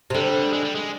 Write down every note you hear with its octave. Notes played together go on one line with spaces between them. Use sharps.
C3
D3 G3
G#3
G3
G#3